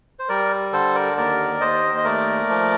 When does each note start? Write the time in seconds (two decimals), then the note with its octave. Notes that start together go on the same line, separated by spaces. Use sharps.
0.19 C5
0.29 G3 A#4 D5
0.72 D3 A4 C5
0.95 A#4 D5
1.17 D#2 A#4 D5
1.60 D#2 C5 D#5
1.97 D#5
2.04 A3 A#4 D5
2.49 F3